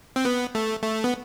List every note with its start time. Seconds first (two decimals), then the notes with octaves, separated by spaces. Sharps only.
0.16 C4
0.25 B3
0.55 A3
0.84 A3
1.04 B3